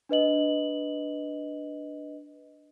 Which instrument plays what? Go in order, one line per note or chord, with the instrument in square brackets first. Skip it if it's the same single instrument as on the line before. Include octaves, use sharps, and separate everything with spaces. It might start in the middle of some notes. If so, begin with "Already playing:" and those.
[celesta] D4 B4 D#5 F#7